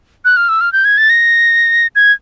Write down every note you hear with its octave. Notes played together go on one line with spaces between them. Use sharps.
F#6
F6
E6
F6
G6
G#6
A6
A#6
G#6